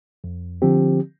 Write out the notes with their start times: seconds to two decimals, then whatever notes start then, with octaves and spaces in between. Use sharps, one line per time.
0.24 F2
0.62 D3 F3 C4 G4